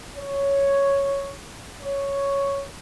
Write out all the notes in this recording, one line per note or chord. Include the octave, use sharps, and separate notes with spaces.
C#5
C#5